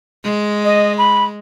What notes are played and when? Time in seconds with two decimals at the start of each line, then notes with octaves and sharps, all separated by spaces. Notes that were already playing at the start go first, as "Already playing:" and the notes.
0.24 G#3
0.65 D#5
0.98 B5